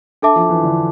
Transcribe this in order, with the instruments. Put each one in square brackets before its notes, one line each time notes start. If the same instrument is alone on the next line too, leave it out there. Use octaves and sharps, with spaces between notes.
[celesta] D4 A4 E5 A5 D6
[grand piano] F3
E3
D3